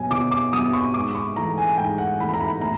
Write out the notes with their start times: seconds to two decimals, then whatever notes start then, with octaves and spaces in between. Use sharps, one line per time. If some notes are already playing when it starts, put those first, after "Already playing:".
Already playing: B2 F#3 B3 G#5
0.11 B2 D6
0.31 D6
0.52 F#3 B3 D#6
0.73 C#6
0.94 G#2 D6
1.15 C#6
1.36 E3 A3 A#5
1.58 G#5
1.78 G#2 G5
1.98 F#5
2.19 E3 A3 B5
2.34 A#5
2.41 B5
2.61 A2 A#5